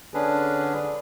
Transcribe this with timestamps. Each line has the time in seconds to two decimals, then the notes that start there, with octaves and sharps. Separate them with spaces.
0.14 D3 C#4 D4 G#4 B4